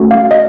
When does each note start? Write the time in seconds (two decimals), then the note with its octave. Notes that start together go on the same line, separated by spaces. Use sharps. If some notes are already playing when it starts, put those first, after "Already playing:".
Already playing: A3 C#4 F#4 A4
0.11 F5
0.31 D#5